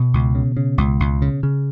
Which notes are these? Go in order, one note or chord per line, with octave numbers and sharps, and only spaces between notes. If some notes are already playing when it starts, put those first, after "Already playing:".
Already playing: B2 B3
C#2
C#3
C#3
C#2
C#2
C#3
C#3